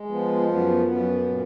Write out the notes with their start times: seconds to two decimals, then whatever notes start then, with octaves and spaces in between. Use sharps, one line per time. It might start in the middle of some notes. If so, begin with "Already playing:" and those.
Already playing: G#3
0.09 F3 B3
0.49 F#2 B3
0.87 F#2 B3
1.27 A#2